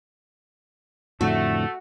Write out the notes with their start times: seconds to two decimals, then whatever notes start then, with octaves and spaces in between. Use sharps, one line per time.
1.21 F2 A2 D3 A3 F#4